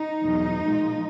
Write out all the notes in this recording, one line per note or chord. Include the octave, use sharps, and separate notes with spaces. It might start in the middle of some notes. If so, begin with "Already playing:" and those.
Already playing: D#4
E2 B2 F#3
A#2 F3 G#3